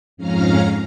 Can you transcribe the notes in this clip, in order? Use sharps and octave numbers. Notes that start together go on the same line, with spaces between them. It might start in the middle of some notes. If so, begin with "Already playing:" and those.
F2 G#2 C#4 F5 A#5 F6